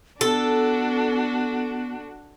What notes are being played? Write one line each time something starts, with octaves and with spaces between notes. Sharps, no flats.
B3 D4 F#4 A4